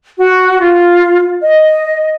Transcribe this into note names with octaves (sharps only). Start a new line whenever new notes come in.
F#4
F4
D#5